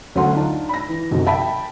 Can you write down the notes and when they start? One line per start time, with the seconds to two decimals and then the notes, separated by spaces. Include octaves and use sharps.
0.15 D2 F#3 C#4 A4 F#5 C6
0.33 D4 D#4 F4
0.69 B5 A#6
0.88 E3
1.11 B1 F#2 C3 F#3
1.27 E5 G5 A5 B5